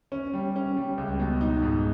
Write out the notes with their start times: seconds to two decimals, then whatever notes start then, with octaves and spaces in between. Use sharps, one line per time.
0.12 C#4
0.34 G3
0.56 C#4
0.77 G3
0.98 C#2
1.20 B2
1.41 D#4
1.62 G#2